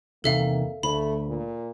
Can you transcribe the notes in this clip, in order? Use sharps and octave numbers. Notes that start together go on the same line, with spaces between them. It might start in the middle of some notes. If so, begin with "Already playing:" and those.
E2 C3 D#3 A#3 A4 E5 F5
D2 A3 B5
A#2